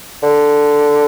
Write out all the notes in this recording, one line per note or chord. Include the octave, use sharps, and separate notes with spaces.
D3